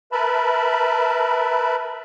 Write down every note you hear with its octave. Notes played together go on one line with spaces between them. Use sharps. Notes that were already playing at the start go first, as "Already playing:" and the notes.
A#4 B4 E5 A5 B5